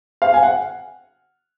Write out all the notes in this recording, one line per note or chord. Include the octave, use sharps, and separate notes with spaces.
F5
G#5
F#5